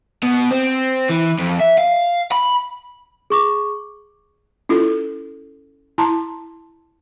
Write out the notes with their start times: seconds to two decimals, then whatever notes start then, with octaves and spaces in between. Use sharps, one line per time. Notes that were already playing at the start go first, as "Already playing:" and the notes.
0.23 B2
0.51 C4
1.10 E3
1.39 F2
1.60 E5
1.78 F5
2.32 B5
3.30 G#4 C#6 D6
4.69 C#4 E4 F4 A4
5.98 E4 A5 A#5 C6